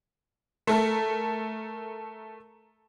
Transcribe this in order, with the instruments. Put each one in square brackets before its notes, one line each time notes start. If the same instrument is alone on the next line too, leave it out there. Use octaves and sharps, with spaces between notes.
[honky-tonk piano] A3 A4 A#4